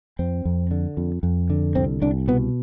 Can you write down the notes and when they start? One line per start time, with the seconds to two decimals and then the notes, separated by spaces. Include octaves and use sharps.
0.19 F2 C4
0.45 F2
0.71 D3
0.97 F2
1.23 F2
1.50 D3
1.75 C2 C4
2.02 C2 D4
2.28 B2 B3